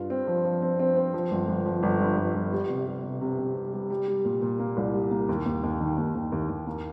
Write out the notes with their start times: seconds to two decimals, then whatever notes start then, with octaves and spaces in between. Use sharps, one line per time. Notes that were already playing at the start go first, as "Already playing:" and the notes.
Already playing: G2 F4
0.10 C4
0.27 F3
0.45 F3
0.62 C4
0.79 C4
0.96 C4
1.14 F3
1.31 G1
1.48 G1
1.66 F3
1.83 G1
2.00 G2
2.17 G1
2.35 G1
2.52 G3
2.69 C3
2.87 G3
3.04 C3
3.21 C3
3.38 C3
3.55 G3
3.73 G3
3.90 G3
4.08 G3
4.25 A#2
4.42 A#2
4.59 A#3
4.77 C2
4.94 G3
5.11 A#3
5.29 D#2
5.46 D#2
5.63 D#2
5.80 D#3
5.97 D#2
6.15 D#2
6.32 D#2
6.49 D#2
6.66 A#3